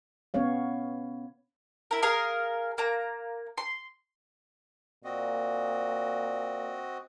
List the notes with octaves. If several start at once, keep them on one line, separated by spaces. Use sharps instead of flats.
B3 C#4 C#5 F5
E4 A#4
G#4 A#4 F5
A#3 A#5
C6
A#2 C4 F#4 D#5